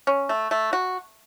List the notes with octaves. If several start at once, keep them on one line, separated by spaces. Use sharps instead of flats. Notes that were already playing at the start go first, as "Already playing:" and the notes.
C#4
A3
A3
F#4